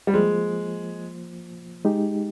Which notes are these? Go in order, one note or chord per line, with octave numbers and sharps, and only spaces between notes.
G3
F3 G#3 A#3 F4 C5
G#3 D#4 G4